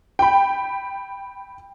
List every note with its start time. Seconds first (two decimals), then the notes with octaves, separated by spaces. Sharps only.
0.19 G5 B5